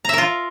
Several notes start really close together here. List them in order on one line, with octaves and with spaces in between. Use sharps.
A#5 E5 A#4 F4